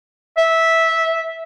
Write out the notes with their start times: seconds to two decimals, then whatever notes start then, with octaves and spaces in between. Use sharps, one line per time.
0.38 E5